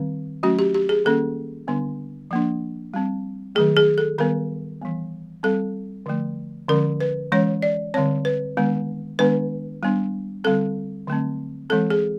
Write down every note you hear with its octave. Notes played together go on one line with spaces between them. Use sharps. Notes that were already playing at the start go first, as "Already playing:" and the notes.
Already playing: D#3 G3 C4
F#3 A3 C#4 F#4
G4
G4
G#4
D#3 G3 A#3 C#4 A4
D3 G3 B3 D4
F3 A#3 D4
G3 C4
D#3 F#3 A3 G#4
G#4
A4
D#3 G3 B3 A#4
E3 G3 B3
G3 C4 A4
D3 F3 A3
D3 F3 G#3 C#4 A#4
B4
E3 G#3 C#4 C#5
D5
D3 G3 C4 C#5
B4
D#3 G#3 B3 D4
D#3 G#3 B3 D4 B4
G3 B3 D4
D3 G3 C4 A4
D3 F#3 A3 C4
E3 G#3 C4 A4
G#4